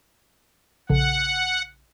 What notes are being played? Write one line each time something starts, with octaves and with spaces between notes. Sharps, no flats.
A#1 C#3 A4 F#5